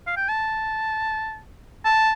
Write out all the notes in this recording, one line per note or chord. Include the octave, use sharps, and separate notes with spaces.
F5
G5
A5
A5